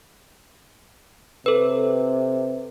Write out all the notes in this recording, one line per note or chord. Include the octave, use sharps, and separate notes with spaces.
C3 A4 B4